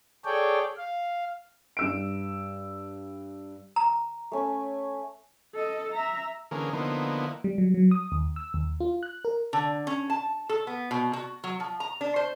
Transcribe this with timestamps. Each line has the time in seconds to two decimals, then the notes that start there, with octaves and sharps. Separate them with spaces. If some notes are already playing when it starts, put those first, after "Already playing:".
0.25 G#4 A4 C#5 D5 G5
0.78 F5
1.77 G2 E6 D7
3.76 A#5
4.32 A3 C#4
5.55 A4 D#5
5.93 E5 A#5
6.51 D3 E3 A#3 C#4 G#4 A#4
6.73 D3 F3 A#3 B3 D#4 E4
7.44 G3
7.58 F#3
7.74 F#3
7.91 D#6
8.12 D#2
8.36 E6
8.54 D#2
8.80 F4
9.03 F#6
9.25 A#4
9.53 D3
9.87 C#4
10.10 A5
10.49 A4
10.67 B3
10.91 B2
11.13 F#4
11.44 F#3
11.60 F3
11.80 A#5
12.01 D4
12.16 C5